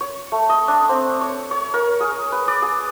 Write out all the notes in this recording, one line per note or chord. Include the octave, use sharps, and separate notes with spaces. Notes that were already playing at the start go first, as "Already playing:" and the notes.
C#5
A3
D#5
D4
C4
C#5
C#5
A#4
G#4
B4
D5
G#4